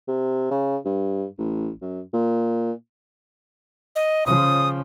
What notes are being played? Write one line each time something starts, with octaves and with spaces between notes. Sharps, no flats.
C3
C#3
G2
A1
F#2
A#2
D#5
C#3 F3 D#6